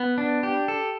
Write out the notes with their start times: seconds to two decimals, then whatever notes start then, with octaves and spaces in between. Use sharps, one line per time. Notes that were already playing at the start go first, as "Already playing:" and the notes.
Already playing: B3
0.18 D4
0.43 G4
0.68 A4